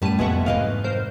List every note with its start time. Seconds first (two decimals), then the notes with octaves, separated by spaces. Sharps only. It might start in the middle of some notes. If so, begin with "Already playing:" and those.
0.02 F#2 A2 G3 A5 D#7
0.19 F1 F2 G#3 A#3 B3 E5 F#5 C#6
0.46 G#2 C3 E3 B4 D#5 F5
0.84 A#4 C5 G6